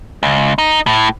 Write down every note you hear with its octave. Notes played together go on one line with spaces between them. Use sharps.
C#2
D#4
A2